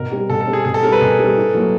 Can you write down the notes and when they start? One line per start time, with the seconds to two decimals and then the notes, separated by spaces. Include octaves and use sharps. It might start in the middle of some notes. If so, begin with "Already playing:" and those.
Already playing: B2 A#4
0.11 G3 C4
0.29 B2 A4
0.41 A4
0.47 G3 C4
0.53 G#4
0.65 B2 G#4
0.74 A4
0.83 G3 C4 A#4
0.92 B4
1.01 B2 G#4
1.19 G3 C4
1.36 A2
1.54 F#3 A#3